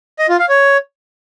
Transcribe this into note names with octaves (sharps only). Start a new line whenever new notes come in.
D#5
F4
F5
C#5